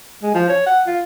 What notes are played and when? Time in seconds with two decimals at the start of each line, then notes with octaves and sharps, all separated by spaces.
0.23 G#3
0.34 F3
0.49 C#5
0.66 F#5
0.87 F4